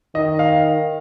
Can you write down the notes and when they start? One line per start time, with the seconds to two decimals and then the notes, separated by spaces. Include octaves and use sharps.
0.15 D#3 D#5
0.39 F5